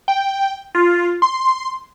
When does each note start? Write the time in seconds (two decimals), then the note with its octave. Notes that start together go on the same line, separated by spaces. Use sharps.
0.08 G5
0.75 F4
1.22 C6